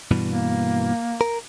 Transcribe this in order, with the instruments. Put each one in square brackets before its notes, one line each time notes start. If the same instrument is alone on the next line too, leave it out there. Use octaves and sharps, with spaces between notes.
[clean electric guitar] G2 B2 E3
[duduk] A#3
[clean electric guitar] A#4